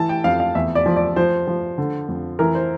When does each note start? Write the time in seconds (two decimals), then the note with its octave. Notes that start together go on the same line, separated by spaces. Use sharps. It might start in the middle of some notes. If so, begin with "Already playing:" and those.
Already playing: E3 A5
0.09 G5
0.24 F2 F5
0.40 F5
0.55 E2 E5
0.75 D5
0.86 F3
0.96 D5
1.16 F3 C5
1.47 F3
1.78 D3
2.08 F2
2.39 E3 A#4
2.55 C5